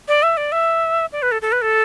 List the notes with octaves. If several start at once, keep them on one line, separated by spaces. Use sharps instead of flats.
D5
E5
D5
E5
D5
B4
A4
A4
B4
A4